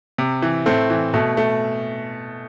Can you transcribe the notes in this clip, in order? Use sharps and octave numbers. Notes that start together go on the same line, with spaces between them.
C3
E3
A2 A3 C4
E3
B2 A3
A3